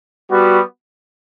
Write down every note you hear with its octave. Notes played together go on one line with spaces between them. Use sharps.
G3 B3 F#4